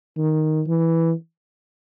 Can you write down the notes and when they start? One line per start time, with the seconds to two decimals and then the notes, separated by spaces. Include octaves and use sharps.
0.17 D#3
0.67 E3